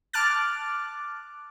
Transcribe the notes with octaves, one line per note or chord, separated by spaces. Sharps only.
A5 D6 F6 F#6 A6